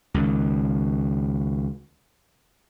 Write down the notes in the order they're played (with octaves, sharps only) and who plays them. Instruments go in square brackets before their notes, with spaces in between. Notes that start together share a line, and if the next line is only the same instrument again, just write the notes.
[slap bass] C#2 D#3